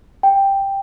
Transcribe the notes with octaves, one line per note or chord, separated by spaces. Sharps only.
G5